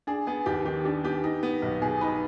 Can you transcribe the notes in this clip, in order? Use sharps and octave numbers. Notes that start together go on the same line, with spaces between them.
D4 G#4
B3 G#4
D#2 G4
D#3 G4
D4 G4
B3 G4
D#4
B3
B1
B2 G#4
D#4 B4